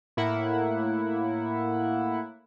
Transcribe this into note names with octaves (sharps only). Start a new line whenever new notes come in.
A2 A#3 E4 F#5